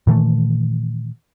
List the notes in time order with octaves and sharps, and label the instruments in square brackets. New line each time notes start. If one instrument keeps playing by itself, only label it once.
[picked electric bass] A#2 D#3 E3 A3